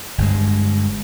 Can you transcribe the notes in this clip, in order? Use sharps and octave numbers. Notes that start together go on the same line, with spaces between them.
G1 G2 G#3